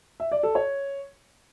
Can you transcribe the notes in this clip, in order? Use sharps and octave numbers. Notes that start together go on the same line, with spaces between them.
E5
D5
A4
C#5